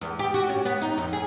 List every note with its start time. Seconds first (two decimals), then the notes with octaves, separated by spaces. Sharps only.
0.01 E2
0.19 G4
0.34 F#4
0.49 C#4
0.65 B3
0.81 D#4
0.98 F2
1.13 G#4